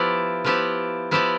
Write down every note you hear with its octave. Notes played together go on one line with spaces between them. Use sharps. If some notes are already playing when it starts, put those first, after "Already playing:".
Already playing: F3 B3 E4 G4 D5
F3 B3 E4 G4 D5
F3 B3 E4 G4 D5